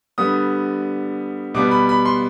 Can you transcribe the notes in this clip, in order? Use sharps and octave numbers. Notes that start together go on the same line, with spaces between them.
D3 G3 B3 D#6
B2 G3 B3 D6
B5
B5
C6